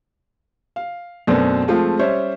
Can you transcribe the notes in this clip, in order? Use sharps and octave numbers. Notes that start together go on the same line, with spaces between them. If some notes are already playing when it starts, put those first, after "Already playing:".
F5
F#2 B2 A3 B3 C4 D4
F3 G#3 A3 C4 F4
G3 C#4 C5 C#5 E5